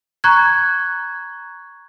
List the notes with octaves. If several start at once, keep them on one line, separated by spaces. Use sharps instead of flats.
A#5 C#6 F#6 G#6